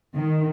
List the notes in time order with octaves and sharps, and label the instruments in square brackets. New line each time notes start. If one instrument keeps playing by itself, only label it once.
[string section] D#3